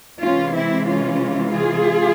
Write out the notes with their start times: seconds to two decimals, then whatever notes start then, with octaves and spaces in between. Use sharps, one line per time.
0.21 C3 E3 G#3 C#4 F4
0.53 C4 E4
0.86 C#4 F4
1.52 F4 G#4